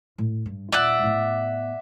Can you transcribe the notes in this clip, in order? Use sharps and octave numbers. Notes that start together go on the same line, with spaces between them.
A2
G2
D#1 F4 D5 E5 F#5
A2 B3